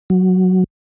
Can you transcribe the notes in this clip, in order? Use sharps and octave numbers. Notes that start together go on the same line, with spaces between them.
F#3